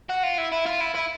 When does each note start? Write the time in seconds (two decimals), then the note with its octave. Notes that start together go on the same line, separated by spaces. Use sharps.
0.09 F#4
0.23 F4
0.38 E4
0.52 E4
0.66 F4
0.80 E4
0.95 E4